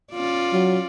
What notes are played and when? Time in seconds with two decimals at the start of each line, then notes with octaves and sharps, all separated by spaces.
0.13 C#4 F4 D5
0.53 F#3